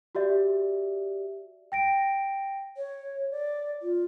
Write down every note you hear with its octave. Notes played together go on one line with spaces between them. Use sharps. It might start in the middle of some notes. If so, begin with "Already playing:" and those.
F#4 G4 D5 E5
G5 A#6 D7
C#5
D5
F4